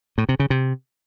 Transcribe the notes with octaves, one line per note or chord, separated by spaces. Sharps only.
A2
C3
C#3
C3